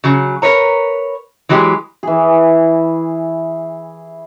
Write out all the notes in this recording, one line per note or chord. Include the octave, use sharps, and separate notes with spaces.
C#3 F#3
A#4 B4 C#5 A#5
E3 F#3 G#3 G4
E3 G#4